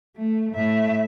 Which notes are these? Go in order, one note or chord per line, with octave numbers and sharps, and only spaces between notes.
A3
A2 E5